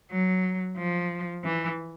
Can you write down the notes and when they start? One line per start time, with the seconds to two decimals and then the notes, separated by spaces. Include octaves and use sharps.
0.11 F#3
0.77 F3
1.44 E3